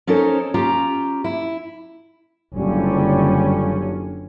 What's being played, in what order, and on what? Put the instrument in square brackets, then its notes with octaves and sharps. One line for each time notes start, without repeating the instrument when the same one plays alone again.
[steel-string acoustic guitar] C#4 D#4 A4 A#4 C5 C#5
C#4 F4 G4 A#5
E4
[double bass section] F#1 D3 C#4 [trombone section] G3 F4